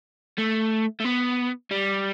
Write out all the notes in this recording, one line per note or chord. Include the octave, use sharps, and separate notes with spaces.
A3
A3
B3
G3